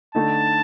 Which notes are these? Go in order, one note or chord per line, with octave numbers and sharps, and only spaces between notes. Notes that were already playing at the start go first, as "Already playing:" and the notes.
D3 A3 D#4 A5